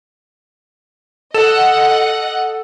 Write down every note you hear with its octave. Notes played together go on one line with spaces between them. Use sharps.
A4 D#5 F#5 E7